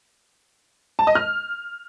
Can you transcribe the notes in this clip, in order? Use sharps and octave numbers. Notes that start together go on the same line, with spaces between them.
A5
D#5
F6